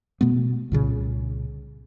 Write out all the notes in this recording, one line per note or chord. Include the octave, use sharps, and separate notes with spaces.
B2 A3 B3
C2 A#2 C#3